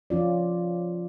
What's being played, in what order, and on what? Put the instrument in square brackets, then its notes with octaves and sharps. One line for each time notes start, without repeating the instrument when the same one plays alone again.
[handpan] F3 C#4 F4 D5